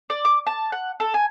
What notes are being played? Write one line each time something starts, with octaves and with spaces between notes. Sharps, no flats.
D5
D6
A5
F#5
A4
G#5